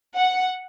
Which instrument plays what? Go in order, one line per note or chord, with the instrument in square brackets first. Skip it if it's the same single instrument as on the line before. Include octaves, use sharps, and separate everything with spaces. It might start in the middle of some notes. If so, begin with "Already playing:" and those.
[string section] F#5